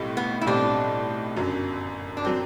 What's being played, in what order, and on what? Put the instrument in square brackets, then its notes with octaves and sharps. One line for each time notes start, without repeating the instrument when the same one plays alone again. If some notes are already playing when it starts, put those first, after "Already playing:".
Already playing: [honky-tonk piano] B1 A2 G3 C4
[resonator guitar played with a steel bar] B3
E4
[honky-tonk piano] B1 A2 G3 C4 G4 [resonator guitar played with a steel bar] D4
[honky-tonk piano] G1 F#2 F#3
[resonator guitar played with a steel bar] D4
[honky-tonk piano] F#3 [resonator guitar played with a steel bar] C4